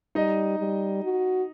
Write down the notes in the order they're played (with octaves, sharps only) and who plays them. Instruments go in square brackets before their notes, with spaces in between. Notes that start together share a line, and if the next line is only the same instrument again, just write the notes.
[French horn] G3 [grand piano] D#4 D#5
[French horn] G3
F#4